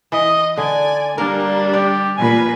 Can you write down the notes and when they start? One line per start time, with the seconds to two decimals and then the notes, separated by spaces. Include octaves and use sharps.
0.12 E3 D#5
0.57 D3 D5 G#5
1.18 G3 A#3 D4 A#4
1.73 G4 D5
2.17 A#2 B4 G#5